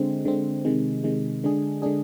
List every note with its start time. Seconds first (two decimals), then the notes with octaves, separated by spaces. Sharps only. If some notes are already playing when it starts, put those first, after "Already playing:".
Already playing: D3 G#3 C4
0.25 D3 G#3 C4
0.65 C3 D#3 G#3
1.04 C3 D#3 G#3
1.44 D3 G#3 D4 G#4
1.82 D3 G#3 D4 G#4